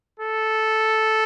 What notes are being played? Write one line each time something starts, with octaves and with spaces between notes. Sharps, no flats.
A4